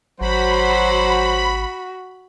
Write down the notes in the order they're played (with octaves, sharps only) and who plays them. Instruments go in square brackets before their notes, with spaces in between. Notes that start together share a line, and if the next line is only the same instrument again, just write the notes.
[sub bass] G#1 [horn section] F#3 C5 [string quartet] F#4 [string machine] B5